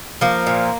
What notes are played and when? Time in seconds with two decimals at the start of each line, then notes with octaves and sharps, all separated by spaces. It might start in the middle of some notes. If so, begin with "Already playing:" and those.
0.21 F3 A#3
0.47 A#2